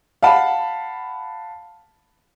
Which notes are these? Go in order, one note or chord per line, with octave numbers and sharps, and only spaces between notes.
F5 F#5 A5 B5